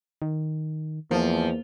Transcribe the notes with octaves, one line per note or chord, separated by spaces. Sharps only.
D#3
E2 F3 A#3